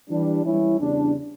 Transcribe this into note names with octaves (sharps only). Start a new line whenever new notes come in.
E3 G3 D4
E3 G3 C#4 E4
E2 C#3 G3 D4